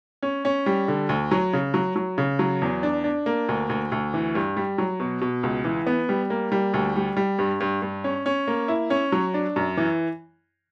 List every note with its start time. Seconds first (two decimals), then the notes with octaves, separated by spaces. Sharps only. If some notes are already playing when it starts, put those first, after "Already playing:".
0.22 C#4
0.45 C#4
0.66 G3
0.88 D3
1.09 D2
1.31 F#3
1.53 C#3
1.74 F#3
1.96 F#3
2.18 C#3
2.39 F#3
2.62 E2
2.83 D4
3.04 D4
3.26 A#3
3.49 D2
3.70 D2
3.92 D2
4.14 E3
4.35 G2
4.57 G3
4.78 F#3
5.00 B2
5.21 B2
5.43 C#2
5.65 E3
5.86 B3
6.09 G3
6.30 A#3
6.52 G3
6.74 D2
6.96 G3
7.17 G3
7.39 G2
7.60 G2
7.82 G2
8.04 C#4
8.26 C#4
8.47 A#3
8.68 E4
8.90 C#4
9.12 F#3
9.34 D4
9.56 F#2
9.77 E3